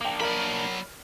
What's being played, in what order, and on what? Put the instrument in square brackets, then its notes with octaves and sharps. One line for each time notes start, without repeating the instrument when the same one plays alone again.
[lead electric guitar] A#3 D4 [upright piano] G5 D6
[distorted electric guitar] F#3 B5 [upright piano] A#4 D5 F6